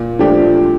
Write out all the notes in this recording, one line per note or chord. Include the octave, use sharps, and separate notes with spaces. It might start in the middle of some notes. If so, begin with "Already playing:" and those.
Already playing: A#2
F3 A3 D4 G4